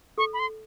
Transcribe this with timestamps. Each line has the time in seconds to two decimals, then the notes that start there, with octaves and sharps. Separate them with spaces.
0.18 A4 C#6
0.33 B5
0.39 C6